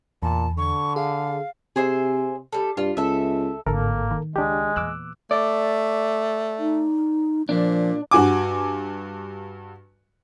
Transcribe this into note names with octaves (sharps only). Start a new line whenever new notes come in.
E2 A#2 A5
D3 C#6
G#4 F5
C3 G#4 C5 E5
G3 A4
G2 F4
C#2 A4 E5
G#1 A2 D3 A#3 A4 A#4
D#3
C#2 G#3 D4 G4
E2 A#2 D6 E6 F#6
A3 D5
D#4
A#2 F3 D4
G2 F#4 G#5 D6